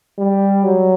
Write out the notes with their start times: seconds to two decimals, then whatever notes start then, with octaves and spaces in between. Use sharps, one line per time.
0.18 G3
0.64 F#3